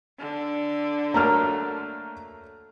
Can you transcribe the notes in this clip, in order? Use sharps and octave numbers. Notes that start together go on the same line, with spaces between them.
D3
F#3 A3 A#3 A#5 F6